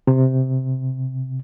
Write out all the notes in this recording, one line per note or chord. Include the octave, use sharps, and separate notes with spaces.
C3